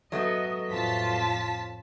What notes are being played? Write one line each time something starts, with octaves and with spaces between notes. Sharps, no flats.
F#3 A3 B3 D#5
F2 A2 F4 A5 B6